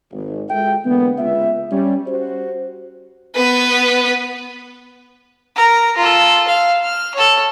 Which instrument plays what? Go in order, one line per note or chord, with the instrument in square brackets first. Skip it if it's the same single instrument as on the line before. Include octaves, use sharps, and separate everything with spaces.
[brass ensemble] G#1
G#3 F4 F#4 A4 E5 G5
D3 E3 G#3 A#3 B3
C#2 F4 B4 E5
G3 C#4
C#4 F#4 G4 C5
[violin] B3 B4
[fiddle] A#4
F4 A4
F5
F6
A4 C#5